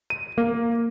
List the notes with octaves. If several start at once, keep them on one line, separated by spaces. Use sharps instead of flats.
D#7
A#3